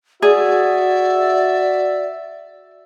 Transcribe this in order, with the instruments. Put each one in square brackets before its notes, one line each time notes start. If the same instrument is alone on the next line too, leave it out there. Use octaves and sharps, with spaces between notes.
[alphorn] F#4 [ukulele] G#4 [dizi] D5 [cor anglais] E5